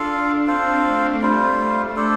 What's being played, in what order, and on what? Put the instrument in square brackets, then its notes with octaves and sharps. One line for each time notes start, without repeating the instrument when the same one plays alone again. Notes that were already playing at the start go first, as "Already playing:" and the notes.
Already playing: [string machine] D4 [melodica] F4 A4 F5
[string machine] C4 [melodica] F4 A4 C5 F5
[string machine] A3
[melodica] G3 F4 C5 [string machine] A3
[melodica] D4 A4 C5